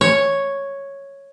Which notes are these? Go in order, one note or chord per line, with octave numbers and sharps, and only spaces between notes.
C#5